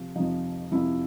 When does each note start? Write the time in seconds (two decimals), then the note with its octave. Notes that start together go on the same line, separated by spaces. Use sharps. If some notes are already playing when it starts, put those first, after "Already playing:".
Already playing: C3 F3
0.16 F2 C3 F3 D#4
0.72 F2 C3 F3 E4